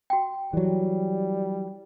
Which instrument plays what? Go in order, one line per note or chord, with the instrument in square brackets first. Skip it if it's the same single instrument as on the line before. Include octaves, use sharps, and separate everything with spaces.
[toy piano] F#4 G5
[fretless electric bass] E3 F#3 [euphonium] G3